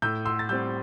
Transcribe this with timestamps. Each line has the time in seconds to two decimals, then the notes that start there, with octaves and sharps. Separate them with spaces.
0.02 A2 E6 G6
0.25 C6 E6
0.39 A6
0.49 G3 C4 E6 G6